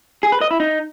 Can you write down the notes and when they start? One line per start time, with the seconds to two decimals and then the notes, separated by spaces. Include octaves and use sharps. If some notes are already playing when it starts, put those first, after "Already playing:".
0.23 G#4
0.32 B4
0.41 D#5
0.51 E4
0.60 D#4